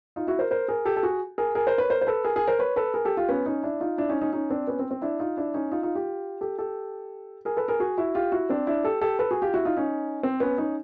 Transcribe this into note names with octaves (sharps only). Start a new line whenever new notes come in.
D#4 F4
E4 F#4
A#4 C5
A#4 C5
G#4 A#4
G4 A4
A4
F#4 G#4
G#4 A#4
G#4 A#4
A#4 C5
B4 C#5
A#4 C5
C5
A4 B4
G#4 A#4
G#4 A#4
A#4 C5
B4 C#5
A4 B4
G#4 A#4
G4 A4
F4 G4
B3 C#4
C#4 D#4
D4 E4
D#4 F4
D4 E4
C#4 D#4
C#4 D#4
C#4 D#4
C4 D4
B3 C#4
C4
C4
D4 E4
D#4 F4
D4 E4
C#4 D#4
D#4 F4
D#4 F4
F4 G4
G4 A4
G4 A4
G#4 A#4
A4 B4
G#4 A#4
F#4 G#4
E4 F#4
F4 G4
E4 F#4
C4 D4
D4 E4
G4 A4
G4 A4
A4 B4
F#4 G#4
F4 G4
E4 F#4
D#4 F4
C#4 D#4
C4
B3 C#4
C#4 D#4